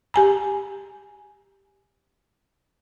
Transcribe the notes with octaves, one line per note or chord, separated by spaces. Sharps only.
G4 G#5 A#5